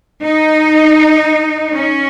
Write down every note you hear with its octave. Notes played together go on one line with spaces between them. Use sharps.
D#4
C#4